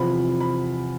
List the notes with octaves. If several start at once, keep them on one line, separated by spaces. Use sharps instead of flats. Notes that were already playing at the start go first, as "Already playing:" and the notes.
Already playing: E2 C3 F3 C4 F4 B5
B5